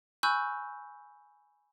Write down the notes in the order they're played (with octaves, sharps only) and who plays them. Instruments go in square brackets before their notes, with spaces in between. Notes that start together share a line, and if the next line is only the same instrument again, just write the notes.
[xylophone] G#5 B5 C#6 E6 F#6 G6